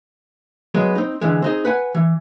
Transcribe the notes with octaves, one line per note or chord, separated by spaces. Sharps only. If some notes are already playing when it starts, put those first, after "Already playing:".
F#3 G#3 B3
C4 D#4
D3 E3 G#3
C4 D#4 G#4
B4 F#5 G#5
E3